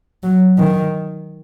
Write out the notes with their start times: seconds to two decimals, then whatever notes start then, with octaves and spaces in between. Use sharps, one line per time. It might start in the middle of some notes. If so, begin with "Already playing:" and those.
0.23 F#3
0.58 D#3